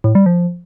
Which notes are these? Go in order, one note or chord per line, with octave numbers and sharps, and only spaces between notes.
A2
G3
F3